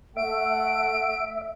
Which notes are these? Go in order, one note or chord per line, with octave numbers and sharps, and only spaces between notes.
A3 E5 F#5 D7